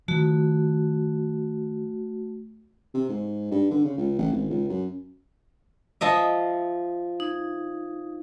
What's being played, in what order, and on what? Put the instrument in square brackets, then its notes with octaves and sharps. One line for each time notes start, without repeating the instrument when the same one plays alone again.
[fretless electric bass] D#3 F3 [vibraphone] A3 F#4
[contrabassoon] C3
G#2
G2
D3
C#3
C#2
A1
G#1
C#2
F#2
[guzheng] F3 D#5 E5
[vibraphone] D#4